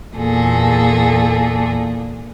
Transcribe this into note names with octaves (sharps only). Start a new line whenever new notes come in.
E2 A#2 G#4 A4